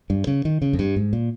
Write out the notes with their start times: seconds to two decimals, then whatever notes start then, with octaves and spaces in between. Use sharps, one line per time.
0.10 G2
0.27 C#3
0.45 D#3
0.62 C#3
0.73 F2
0.79 G2
0.96 G#2
1.13 A#2